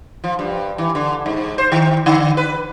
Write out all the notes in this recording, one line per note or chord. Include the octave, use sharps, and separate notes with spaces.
F3
G2
E3
D3
G#2
C5
D#3
D3
B4